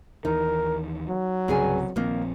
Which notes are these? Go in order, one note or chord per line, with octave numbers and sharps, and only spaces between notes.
D#2 E3 D#4 A#4
F#3
C2 G2 C#3 C4 G#4 G#5
A#1 D#3 F3 A#3 C4